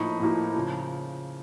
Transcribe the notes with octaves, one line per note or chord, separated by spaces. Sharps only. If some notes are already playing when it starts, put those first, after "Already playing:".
Already playing: A2 F3 A#3 D#4 B5 C#6
A2 F3 A#3 D#4
C#3 F3